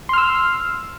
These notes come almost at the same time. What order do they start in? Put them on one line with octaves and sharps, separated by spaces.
C6 F6 E6